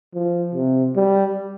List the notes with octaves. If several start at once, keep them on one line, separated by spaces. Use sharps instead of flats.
F3
C3
G3